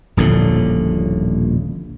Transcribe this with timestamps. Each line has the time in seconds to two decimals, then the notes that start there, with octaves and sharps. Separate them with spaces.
0.17 D#1 A#1 A2 D3